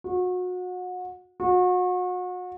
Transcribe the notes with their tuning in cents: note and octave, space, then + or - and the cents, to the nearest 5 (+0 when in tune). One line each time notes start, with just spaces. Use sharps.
F#4 -30
F#4 -35